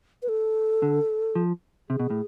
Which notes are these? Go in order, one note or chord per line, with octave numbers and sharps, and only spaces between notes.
B4
A4
D3
F3
C3 G#4
B2
A2